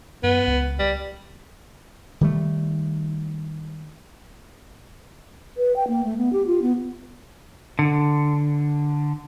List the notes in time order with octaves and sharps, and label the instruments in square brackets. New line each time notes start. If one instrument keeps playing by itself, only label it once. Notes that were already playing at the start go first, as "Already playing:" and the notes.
[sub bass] F#2 [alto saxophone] B3
[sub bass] C#2
[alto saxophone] G3
[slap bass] D#3 G3 A3
[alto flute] B4
G5
A#3
A3
B3
G4
F4
B3
[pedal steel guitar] D3